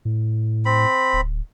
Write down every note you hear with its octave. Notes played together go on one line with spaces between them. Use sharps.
A2
C4 B5
D1